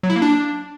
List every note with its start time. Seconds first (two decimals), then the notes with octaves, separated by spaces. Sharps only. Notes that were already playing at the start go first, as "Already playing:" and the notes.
0.03 F#3
0.10 E4
0.16 A#3
0.22 D4